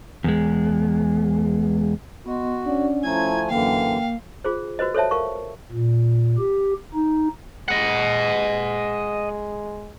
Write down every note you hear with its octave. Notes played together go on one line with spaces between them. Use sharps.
E2 G#3
B3 F#4 D#5 C6
C#4 D4 D5 F#5
F3 A3 E4 G#5 A#5 G#6
F#2 D3 E3 A#3 F5 G5
F4 G#4 C5
F#4 B4 C5 D#5
A4 C5 C#5 E5 A5
A#4 F5 C#6
A#2
G4
D#4
G#3 D#5 F#5